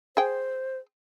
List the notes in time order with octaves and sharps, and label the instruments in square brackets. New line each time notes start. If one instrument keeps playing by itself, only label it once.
[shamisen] G#4 G5 [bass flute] C5